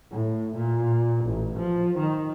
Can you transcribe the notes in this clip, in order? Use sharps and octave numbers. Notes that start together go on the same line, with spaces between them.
A2
A#2
A1
F3
D#3